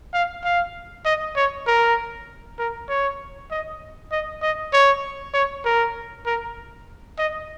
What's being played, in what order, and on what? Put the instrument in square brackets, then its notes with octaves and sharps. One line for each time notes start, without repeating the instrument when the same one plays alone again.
[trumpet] F5
F5
D#5
C#5
A#4
A#4
C#5
D#5
D#5
D#5
C#5
C#5
A#4
A#4
D#5